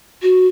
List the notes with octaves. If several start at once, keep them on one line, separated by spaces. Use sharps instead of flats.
F#4